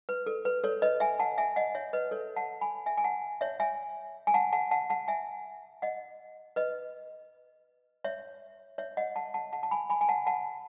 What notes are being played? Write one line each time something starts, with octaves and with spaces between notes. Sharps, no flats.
B4
A4
B4
A4 C#5
B4 D#5
E5 G#5
F#5 A5
E5 G#5
D#5 F#5
C#5 E5
B4 D#5
A4 C#5
F#5 A5
G#5 B5
E5 G#5
G#5
F#5 A5
C#5 E5
E5 G#5
G#5
F#5 A5
F#5 A5
F#5 A5
F#5 A5
E5 G#5
D#5 F#5
B4 D#5
C#5 E5
C#5 E5
D#5 F#5
F#5 A5
F#5 A5
F#5 A5
A5
G#5 B5
G#5 B5
G#5
F#5 A5
F#5 A5